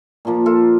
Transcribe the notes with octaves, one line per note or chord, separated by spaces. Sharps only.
A#2 F3 A#3
F4 A4